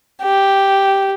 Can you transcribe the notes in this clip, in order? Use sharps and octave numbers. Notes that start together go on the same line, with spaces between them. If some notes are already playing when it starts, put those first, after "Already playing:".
G4